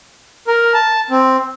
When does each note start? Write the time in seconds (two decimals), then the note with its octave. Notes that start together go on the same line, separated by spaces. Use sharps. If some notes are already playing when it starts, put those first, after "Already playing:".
0.47 A#4
0.74 A5
1.10 C4